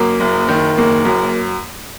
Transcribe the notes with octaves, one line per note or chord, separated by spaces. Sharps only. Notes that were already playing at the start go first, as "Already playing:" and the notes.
Already playing: F#2 A#3
F#1
D#3
F#1 A#3
F#2